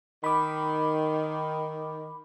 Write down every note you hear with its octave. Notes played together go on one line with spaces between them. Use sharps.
D#3 B5 D6